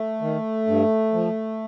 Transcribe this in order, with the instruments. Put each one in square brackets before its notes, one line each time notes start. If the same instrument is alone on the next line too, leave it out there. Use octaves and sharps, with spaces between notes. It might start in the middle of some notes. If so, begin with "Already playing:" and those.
Already playing: [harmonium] A3
D#3
G2
F3